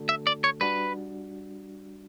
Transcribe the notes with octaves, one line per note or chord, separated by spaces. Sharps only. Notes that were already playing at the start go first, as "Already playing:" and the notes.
Already playing: D3 A3 D4 F#4 A4
E5
D5
C#5
G3 D4 F#4 B4